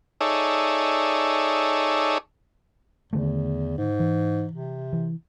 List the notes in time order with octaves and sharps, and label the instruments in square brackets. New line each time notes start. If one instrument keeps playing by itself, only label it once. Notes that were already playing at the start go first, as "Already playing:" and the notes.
[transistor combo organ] D#4 G#4 A4 C#5 D5 E5
[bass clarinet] E2 [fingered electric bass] D3 D#3 A3
[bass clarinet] G#2
[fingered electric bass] E3
[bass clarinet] C3
[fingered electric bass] E3